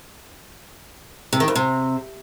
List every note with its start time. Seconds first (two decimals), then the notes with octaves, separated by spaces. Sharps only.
1.33 C3
1.40 D#3
1.48 F2
1.55 C3